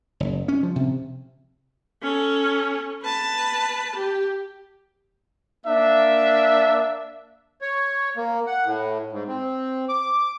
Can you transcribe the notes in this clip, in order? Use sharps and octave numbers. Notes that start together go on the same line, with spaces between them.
F#1
C#4
F3
C3
C#4 A4
B4 A5
G4
A#3 D4 E5
C#5
A#3
F#5
A2
G#2
C4
D6